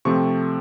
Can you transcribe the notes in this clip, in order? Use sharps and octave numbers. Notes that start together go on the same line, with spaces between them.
C3 F3 A3 C4 C#6